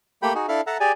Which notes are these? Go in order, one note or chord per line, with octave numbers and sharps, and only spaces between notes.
A3 A#3 G4 G5 B5
D#4 F#4 G#4
D4 E4 A4 E5 F5
A4 E5 F#5 A5 A#5
G4 G#4 D5 G#5